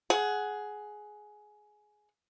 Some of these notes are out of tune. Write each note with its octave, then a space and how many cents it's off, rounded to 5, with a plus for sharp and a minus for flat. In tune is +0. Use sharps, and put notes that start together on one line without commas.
G#4 +15 F#5 +0